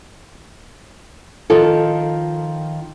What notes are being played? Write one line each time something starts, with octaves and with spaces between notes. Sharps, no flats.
D#3 F3 F4 A4